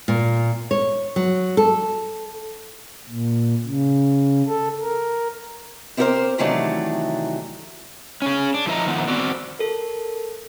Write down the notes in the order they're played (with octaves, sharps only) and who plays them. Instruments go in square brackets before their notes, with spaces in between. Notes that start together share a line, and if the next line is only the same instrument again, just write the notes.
[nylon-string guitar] A#2
C#5
F#3
A4
[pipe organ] A#2
C#3
A4
A#4
[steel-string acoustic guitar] C4 E4 G4 A4 A#4 C5
C3 D#3 E3 F#3 A3 D4
[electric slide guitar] C#4 G#4
D4
F3 E4 B4 D#5 A#5
D#3 F3 A3 B3
C4 F#4 D5
[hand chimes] A4 A#4